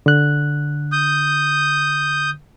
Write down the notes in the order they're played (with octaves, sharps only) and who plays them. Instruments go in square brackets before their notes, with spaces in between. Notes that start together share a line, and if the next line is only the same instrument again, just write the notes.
[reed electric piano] D3 F#6
[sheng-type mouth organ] D#6 G6